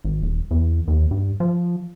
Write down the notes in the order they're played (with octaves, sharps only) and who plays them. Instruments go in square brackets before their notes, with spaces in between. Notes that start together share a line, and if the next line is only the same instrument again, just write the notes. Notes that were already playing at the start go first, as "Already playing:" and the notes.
[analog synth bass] G#1
D#1
E2
D#2
G2
F3